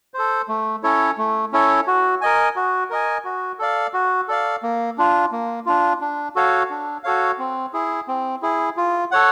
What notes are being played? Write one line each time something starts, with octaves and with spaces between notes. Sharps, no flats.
A4 C5
A3
C#4 E4 A4 C#5
A3
C#4 E4 A4 C#5
F#4
A#4 D#5 G#5
F#4
A#4 D#5 G#5
F#4
A4 D5 F5
F#4
A4 D5 F5
A#3
D4 F4
A#3
D4 F4
D4
F#4 A4 C#5 F5
D4
F#4 A4 C#5 F5
C4
E4 G#4
C4
E4 G#4
F4
A4 C#5 F#5